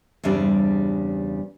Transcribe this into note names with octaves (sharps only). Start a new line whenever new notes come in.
E2 G2 C#3 G3 C4 D4